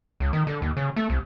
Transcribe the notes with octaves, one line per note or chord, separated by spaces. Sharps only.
C#2
D#3
D3
D#2
C#3
A3
C2